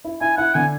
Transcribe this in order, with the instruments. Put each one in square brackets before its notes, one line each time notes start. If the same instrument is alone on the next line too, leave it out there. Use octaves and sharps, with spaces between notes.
[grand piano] E4
[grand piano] E4 [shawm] G#5
[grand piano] E4 [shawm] F#5
[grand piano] D3 [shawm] G#5